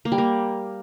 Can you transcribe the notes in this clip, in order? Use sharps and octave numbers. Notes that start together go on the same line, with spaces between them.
A#3
G3
A#3